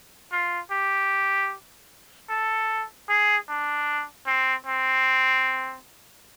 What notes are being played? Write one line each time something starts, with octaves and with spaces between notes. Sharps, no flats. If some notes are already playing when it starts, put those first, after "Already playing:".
F4
G4
A4
G#4
D4
C4
C4